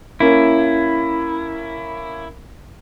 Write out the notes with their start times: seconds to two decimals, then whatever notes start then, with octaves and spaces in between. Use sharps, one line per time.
0.20 A#3 C#4 E4